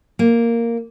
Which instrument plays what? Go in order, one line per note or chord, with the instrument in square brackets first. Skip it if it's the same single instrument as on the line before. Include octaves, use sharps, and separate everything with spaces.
[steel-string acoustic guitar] A#3